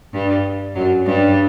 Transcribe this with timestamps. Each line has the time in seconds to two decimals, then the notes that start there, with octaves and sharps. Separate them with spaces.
0.13 G2 G3
0.75 F#2 F#3
1.06 G2 G3